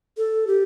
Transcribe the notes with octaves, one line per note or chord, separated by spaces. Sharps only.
A4
G4